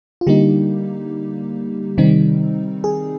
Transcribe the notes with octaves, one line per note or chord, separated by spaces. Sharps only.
F4
D3 G3 A#3 D#4 G4
C3 D#3 G3 C4 D#4
G#4